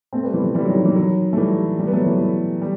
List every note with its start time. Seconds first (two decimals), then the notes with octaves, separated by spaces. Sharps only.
0.13 A3 C4
0.23 G3 B3
0.34 E3
0.44 E3
0.55 E3 G3
0.65 D#3 F#3
0.75 D#3
0.85 E3
0.96 D#3 F#3
1.33 A3
1.37 E3 G3
1.79 E3 G3
1.87 B3
1.93 F#3 A3
2.06 E3 G3
2.21 E3
2.61 G3